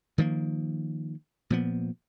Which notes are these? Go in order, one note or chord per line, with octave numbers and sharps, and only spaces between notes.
D#3 F3 G3 A#3
A#2 F3 B3